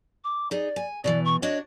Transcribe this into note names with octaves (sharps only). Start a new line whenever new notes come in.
D6
D#4 G#4 D5
G#5
B2 D#3 E3 D5
C#6
D4 F#4 C#5 D#5